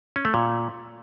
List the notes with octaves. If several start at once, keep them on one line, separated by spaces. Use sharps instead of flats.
C#4
A3
A#2